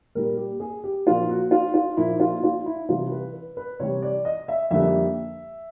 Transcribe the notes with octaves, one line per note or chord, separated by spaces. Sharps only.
A#2 G3 A#3 A#4
G4
G#4
G4
A#2 F3 A#3 F4
F#4
F4
F4
A#2 F3 A#3 E4
F4
F4
E4
C3 E3 G3 F4
B4
B4
B4
C3 E3 G3 C#5
D5
D#5
E5
F2 D3 G3 A#3 E5